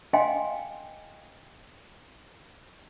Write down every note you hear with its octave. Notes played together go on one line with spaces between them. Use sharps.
D#5 F5 G5 G#5 C6